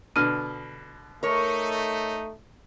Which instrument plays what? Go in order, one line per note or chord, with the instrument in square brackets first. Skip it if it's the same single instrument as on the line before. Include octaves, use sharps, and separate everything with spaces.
[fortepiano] B2 D3 [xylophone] F6 D#7
[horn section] A3 D#4 [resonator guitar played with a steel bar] A#4 C#5